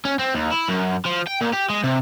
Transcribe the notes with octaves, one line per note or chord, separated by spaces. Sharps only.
C#4
C4
D#2
E4
F#2
F3
G5
A#2
G4
G#3
C3